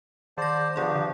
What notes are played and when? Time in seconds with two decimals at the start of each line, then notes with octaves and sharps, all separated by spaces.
0.38 D#3 C5 D5 A5 A#6
0.76 D3 F3 B3 D4 G#4 D5
0.96 D3